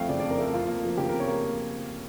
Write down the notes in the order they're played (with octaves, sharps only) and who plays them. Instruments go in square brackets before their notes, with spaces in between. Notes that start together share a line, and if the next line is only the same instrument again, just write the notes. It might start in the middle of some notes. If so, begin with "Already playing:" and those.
Already playing: [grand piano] F2 F3 A3 F5 G5
C#3 D5
F2 D5
A#4
A3 A4
F2 F4
A#3
F3
C#3 G4
F2 A#4
C#5
A#3